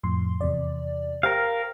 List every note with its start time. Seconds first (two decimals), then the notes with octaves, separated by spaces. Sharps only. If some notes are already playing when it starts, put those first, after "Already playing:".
0.03 F2 A2 C6
0.41 E2 C3 D5
1.23 G4 A#4 C5 F5 G5